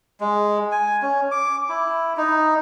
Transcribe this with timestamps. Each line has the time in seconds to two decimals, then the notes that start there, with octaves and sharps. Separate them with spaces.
0.20 G#3
0.72 G#5
1.02 C#4
1.31 D6
1.69 E4
2.17 D#4